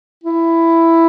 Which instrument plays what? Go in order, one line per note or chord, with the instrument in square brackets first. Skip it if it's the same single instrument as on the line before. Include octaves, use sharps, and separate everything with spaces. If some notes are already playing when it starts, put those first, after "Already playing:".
[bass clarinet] E4